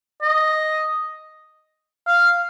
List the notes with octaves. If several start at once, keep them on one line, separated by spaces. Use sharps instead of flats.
D#5
F5